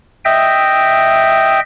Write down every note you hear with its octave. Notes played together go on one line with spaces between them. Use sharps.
D#5 E5 G5